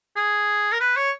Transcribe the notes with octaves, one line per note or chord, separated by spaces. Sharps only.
G#4
A#4
B4
C#5